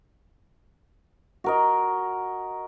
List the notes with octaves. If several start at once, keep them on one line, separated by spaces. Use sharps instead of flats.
F#4 A#4 D#5